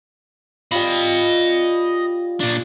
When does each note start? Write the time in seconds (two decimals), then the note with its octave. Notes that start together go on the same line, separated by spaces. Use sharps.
0.72 G3 F4 D#5 B5
2.41 A#2 D4